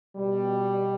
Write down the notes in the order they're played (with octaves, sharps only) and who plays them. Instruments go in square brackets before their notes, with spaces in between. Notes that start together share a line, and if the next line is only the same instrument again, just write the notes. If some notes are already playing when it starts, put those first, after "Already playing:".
[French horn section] B2 G3